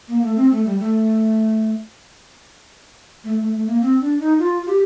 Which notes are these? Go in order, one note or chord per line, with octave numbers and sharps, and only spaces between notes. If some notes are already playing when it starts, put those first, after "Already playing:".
A#3
A3
C4
A3
G3
A3
A3
A3
A3
A#3
C4
D4
D#4
F4
F4
G4